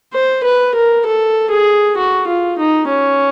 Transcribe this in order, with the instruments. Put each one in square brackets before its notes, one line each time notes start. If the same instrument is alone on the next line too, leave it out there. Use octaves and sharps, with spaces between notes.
[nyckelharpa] C5
B4
A#4
A4
G#4
F#4
F4
D#4
C#4